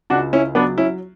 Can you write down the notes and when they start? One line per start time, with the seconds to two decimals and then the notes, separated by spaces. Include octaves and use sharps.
0.10 C#2 D4 F#4
0.33 C#4 E4
0.55 F#3 B3 D4
0.78 C#4 E4